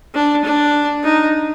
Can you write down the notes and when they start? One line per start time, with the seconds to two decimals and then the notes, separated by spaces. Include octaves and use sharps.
0.15 D4
0.45 D4
1.04 D#4